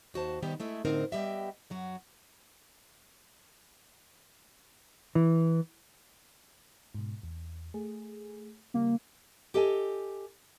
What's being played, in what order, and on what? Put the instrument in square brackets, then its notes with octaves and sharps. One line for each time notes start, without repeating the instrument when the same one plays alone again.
[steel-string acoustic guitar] D#2 F#4 C5 A5
C3 D#3 G3 B3 G4
G#3 A3 E4
A2 D3 C4 D#4 A#4 C5
G3 B3 G4 D#5 E5 G5
F#2 F#3 F#4
[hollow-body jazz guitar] E3
[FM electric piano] G#2 B2
E2
A3 G#4
[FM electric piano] C#3 G3 [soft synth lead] A#3
[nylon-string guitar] G4 A4 D#5 G5 G#5